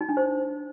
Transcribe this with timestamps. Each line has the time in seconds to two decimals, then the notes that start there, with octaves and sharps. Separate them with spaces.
0.01 D#4
0.09 D4
0.17 C5